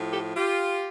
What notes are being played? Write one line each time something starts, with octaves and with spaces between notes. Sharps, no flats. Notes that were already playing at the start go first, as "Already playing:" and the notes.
Already playing: A2 F3
G4 A4
F4 G4